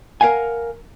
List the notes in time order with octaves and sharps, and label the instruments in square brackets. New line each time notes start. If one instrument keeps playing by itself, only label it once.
[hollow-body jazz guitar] A#4 B4 F5 F#5 G#5